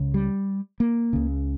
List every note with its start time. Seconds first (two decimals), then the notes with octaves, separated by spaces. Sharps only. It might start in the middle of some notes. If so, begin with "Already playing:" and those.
Already playing: C#2 C#3
0.14 G3
0.80 A#3
1.13 C#2 C#3